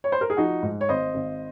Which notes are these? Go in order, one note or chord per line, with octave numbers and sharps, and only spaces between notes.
C#5
C5
A#4
G#4
F3 D#4 F#4
G#2
C#5
G#1 C5 D#5
G#1